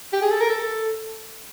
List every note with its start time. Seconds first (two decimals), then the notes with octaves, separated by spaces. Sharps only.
0.13 G4
0.22 G#4
0.31 A4
0.41 A#4
0.50 A4